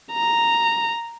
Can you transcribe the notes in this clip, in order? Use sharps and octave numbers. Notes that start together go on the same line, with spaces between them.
A#5